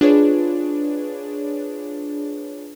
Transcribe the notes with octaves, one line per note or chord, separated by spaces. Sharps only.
D4 F4 G#4 B4 C#5